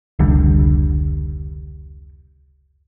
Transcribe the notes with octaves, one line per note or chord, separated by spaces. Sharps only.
F1 C#2 D3 G3